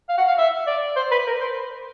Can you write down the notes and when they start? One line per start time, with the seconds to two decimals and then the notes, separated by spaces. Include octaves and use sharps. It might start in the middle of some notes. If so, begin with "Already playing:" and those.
0.09 F5
0.18 F#5
0.28 F5
0.38 E5
0.67 D5
0.96 C5
1.12 B4
1.27 A#4
1.41 C5